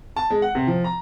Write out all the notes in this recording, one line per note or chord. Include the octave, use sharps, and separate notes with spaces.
A5
G#3
F#5
C3
F3
A#5